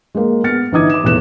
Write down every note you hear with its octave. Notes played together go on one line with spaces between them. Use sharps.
G#3 A#3
B3 F6 A6 C#7
G1 E3 D#4 D6 D#6 G#6
D6 E7
B1 E2 A2 F#6 E7